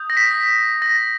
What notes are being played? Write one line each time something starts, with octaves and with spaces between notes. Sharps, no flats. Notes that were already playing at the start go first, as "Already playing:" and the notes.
Already playing: D#6 G6
A#6
B6
A#6